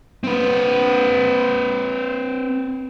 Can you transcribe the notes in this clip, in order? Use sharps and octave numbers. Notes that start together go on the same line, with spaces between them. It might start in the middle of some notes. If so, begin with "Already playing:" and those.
C4 B4